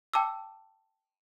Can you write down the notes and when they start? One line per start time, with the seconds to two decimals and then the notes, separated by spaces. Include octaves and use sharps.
0.14 G5 A5 D6 E6